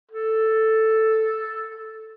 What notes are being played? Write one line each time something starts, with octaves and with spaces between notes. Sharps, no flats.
A4